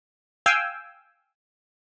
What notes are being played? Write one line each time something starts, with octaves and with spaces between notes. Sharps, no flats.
F5 G5 G#5 E6